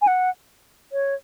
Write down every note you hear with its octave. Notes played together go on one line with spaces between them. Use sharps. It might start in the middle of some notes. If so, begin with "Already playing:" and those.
G#5
F#5
C#5